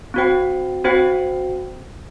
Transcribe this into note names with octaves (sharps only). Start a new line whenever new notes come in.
C4 F#4 C5 G5
C4 F#4 C5 G5